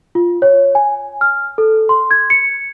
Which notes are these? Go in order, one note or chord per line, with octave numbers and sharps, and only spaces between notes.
F4
C#5
G#5
F6
A4
C6
G#6
C#7